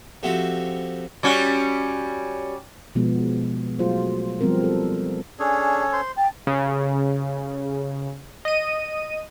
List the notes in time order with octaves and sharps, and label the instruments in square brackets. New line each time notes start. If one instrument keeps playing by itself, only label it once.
[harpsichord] F3 A3 C4 F#4 G4
[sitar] G3 C#4 F#4
[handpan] B2 F3 G#3 B3
F#3 A3 F4 G#4 C5
F3 G3 B3 C4 A#4
A4
[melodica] C#4 A4 C#5 [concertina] D4 G#4
[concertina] C5 C6
[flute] G5 [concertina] A5
[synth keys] C#3
D#5 D#7